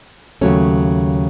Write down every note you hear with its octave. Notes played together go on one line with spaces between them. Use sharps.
D#2 C#3 F#3 A3 C#4